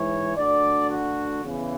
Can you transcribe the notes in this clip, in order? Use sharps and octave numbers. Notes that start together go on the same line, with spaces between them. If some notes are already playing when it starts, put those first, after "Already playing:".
Already playing: G#2 E3 C#5
D2 D3 D5
F#4
E2 C#3 E3